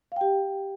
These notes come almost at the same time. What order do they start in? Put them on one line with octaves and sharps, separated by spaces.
F5 G5 G4